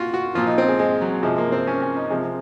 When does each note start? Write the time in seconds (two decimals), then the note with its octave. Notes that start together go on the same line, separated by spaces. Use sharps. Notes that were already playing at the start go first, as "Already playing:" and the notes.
Already playing: A#2 F4 F#4
0.14 F#4
0.35 A#2 F3 F4
0.47 D#4
0.58 C4
0.68 G#3
0.79 G#3
1.01 F#3
1.23 C3 F3 G#3
1.38 A#3
1.52 C4
1.67 C#4
1.81 C#4
1.97 D#4
2.10 C3 F3 G#3